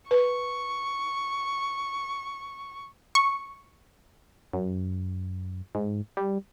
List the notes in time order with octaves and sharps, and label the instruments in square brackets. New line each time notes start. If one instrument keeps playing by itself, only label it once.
[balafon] B4 [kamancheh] C#6
[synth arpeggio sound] C#6
[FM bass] F#2
G#2
G3